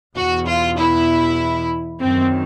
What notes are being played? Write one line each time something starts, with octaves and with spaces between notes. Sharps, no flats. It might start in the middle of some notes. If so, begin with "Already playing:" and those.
E2 B2 F#4
F4
E4
F#2 D#3 C4